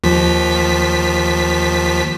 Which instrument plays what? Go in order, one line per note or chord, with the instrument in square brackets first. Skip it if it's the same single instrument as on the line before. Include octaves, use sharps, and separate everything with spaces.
[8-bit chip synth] D#2 F3 B6